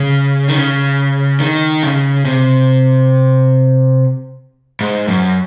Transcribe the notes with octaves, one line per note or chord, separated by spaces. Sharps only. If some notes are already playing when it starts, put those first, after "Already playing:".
Already playing: C#3
D#3
C#3
D#3
C#3
C3
G#2
F#2